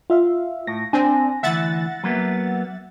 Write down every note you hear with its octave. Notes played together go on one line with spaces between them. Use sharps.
F4 E5 F5
A2 A#6
C4 D4 G#5
D2 E3 E5 F#5 A6
F#3 A#3 B3